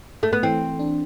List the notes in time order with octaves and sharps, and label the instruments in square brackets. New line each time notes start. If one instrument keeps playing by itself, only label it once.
[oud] A3
B3
[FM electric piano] E3 [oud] C4
[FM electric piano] D4